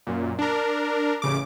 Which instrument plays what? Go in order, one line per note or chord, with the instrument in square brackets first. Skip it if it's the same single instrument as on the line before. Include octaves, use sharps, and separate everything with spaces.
[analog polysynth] F#2 A#2
D4 A#4
A1 C#3 D6